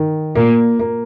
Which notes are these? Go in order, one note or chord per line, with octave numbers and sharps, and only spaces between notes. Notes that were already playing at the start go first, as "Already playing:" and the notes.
Already playing: D#3
A#2 A#3
A#3